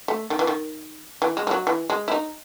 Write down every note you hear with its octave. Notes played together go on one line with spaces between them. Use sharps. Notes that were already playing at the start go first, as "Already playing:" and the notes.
A3
D#3
E3
D#3
E3
G#3
G#3
F#3
E3
G#3
E4
D#4